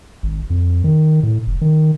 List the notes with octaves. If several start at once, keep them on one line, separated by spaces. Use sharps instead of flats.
G#1
F2
D#3
A2
F#1
D#3